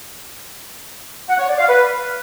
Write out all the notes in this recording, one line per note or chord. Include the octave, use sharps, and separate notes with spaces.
F#5
C#5
D5
F5
B4